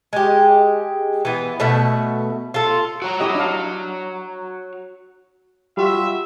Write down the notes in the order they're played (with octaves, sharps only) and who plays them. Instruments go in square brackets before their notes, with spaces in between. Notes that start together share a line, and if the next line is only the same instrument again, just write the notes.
[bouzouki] G#3 G4
E3 B3
B2 A3 E5 F#5
F4 A4
[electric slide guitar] F#4 C#5 A#5
[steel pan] E4 G4 D#5
D4 F5
[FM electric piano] G3 F4 F#4 [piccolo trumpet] E5